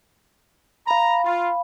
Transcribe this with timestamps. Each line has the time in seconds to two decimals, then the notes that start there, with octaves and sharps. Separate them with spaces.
0.87 F5 A#5 B5
1.25 F4